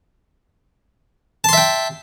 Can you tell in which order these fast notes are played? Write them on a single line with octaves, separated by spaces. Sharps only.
A5 C6 E5 G5